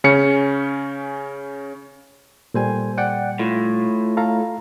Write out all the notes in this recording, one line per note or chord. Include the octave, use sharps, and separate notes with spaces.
C#3 C#4 C#7
A#2 G3 A4 C5 G#5
D5 F#5 G5
A2 F4
A4 F5 A#5